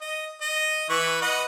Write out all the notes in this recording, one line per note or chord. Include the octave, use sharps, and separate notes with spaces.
D#5
D#5
E3 B4 C#6
B4 D#5 F#5